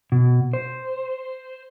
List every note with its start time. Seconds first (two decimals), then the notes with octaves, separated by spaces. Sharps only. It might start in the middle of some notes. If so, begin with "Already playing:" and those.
0.12 B2
0.53 C5